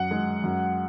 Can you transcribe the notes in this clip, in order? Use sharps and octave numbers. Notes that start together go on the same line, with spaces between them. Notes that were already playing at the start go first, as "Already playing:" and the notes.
Already playing: F#2 F#5
G#3
F#2